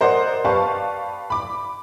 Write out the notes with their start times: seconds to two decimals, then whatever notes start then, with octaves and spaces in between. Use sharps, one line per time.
0.01 A#4 C5 D5 D#5 F#5
0.45 G4 B4 D5 F5 A5 C#6
1.30 B5 D6